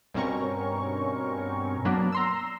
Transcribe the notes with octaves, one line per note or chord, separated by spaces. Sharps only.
G2 B2 C4 C#4 A#4 C#6
F#3 A#3 B3 D4
A#5 C6 E6